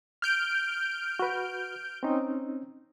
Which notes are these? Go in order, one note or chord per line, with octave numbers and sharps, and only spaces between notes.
F6 G6 D7
F#4 B4
C4 C#4 D#4